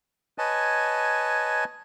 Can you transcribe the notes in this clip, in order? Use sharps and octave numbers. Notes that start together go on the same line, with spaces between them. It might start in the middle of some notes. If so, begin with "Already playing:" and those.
B4 C#5 D#5 G#5 A5